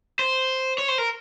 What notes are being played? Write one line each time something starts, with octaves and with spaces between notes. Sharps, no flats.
C5
C#5
C5
A#4